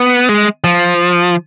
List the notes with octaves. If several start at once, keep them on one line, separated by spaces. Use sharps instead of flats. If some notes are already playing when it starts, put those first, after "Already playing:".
Already playing: B3
G#3
F3